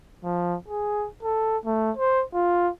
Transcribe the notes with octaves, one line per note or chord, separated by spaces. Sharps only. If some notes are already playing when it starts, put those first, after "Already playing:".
F3
G#4
A4
A3
C5
F4